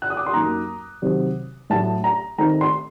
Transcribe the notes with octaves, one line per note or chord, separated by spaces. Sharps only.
F#6
D#6
D6
C6
F#2 F#3 A#3 D#4 A#5
C3 D#3 F#3 C4
A2 F#3 A3 D4 A5
A#5
D#3 A3 C4 D#4 A#5
C6